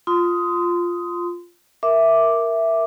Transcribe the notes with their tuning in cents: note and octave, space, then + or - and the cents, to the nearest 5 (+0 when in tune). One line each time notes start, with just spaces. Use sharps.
F4 +0 C6 -20 D#6 +10
A#4 +0 E5 +0 D6 +0